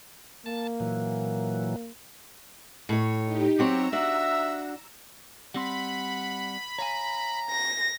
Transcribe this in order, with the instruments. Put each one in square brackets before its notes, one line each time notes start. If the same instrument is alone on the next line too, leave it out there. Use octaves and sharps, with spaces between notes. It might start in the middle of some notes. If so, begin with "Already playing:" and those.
[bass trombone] A#3 [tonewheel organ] A5
[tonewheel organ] A#2 E3 F#3
[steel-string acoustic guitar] A2 C#5
[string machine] D#4 G4
[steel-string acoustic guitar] F#3 C4 C#5 [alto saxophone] G4 [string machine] A#5 E6
[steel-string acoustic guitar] D4 F#4 [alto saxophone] E5
[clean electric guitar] G3 C4 C6 [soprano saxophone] F#5 [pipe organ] B5
[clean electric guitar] C#5 F5 G#5 [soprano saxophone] A#5
[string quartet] A#6